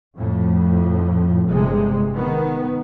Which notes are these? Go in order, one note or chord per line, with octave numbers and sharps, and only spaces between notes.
F2 A2
G1 C3 G#3
D#3 B3